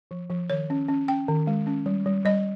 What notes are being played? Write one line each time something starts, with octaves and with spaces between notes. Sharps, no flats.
F3
F3
D#3 C#5
C#4
C#4
C#4 G5
D#3
G#3
C#4
G3
G3
G3 D#5